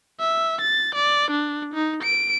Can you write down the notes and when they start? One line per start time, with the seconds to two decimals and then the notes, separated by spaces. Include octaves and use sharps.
0.20 E5
0.61 A6
0.95 D5
1.31 D4
1.74 D#4
2.03 D7